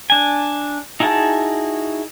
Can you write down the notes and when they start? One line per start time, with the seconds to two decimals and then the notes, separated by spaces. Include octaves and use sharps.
0.10 D4 G#5
1.00 D#4 E4 F#4 G#4 A5